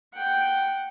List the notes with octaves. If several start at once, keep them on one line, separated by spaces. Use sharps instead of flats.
F#5 G5